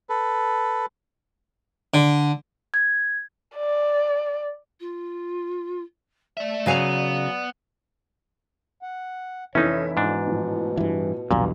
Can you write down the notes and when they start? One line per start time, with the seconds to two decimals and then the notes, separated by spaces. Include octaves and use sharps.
0.09 A4 B4
1.94 D3
2.74 G#6
3.56 D5
4.80 F4
6.37 A3 D5 E5
6.66 C#3 F#3 B3 F5 G#5 F7
8.82 F#5
9.55 F1 E3 C#4 D#4 E4 C#5 E5
9.97 G#2 B2 D4
10.27 A2 F3
10.77 G2 E3
11.31 B1 E2 G2 A#2